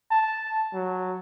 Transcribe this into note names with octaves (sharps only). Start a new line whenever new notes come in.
A5
F#3